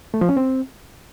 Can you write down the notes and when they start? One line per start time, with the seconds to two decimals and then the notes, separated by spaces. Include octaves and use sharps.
0.14 A3
0.21 F3
0.29 C#4
0.37 C4